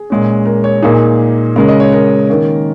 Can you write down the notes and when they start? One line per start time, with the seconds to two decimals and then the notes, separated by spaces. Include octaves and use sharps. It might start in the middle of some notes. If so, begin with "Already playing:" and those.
Already playing: G#4
0.10 A#2 G#3 C#4
0.45 A#4
0.64 C#5
0.82 A#2 A#3 D#4 G#4
1.56 C#3 G#3 C#4 A#4
1.68 D#5
1.80 C#5
1.92 A#4
2.29 D#3 A#3 C#4